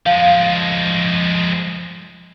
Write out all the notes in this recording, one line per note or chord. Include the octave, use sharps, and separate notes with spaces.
F3 G#3 F5